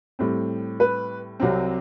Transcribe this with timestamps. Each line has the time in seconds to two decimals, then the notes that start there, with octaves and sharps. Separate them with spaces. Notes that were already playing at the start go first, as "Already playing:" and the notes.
0.19 A2 G3 C4
0.80 B4
1.40 C2 C3 F#3 C4